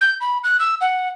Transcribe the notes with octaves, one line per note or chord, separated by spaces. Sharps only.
G6
B5
F#6
E6
F#5